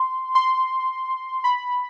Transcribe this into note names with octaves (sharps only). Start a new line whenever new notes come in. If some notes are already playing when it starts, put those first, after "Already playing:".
Already playing: C6
C6
B5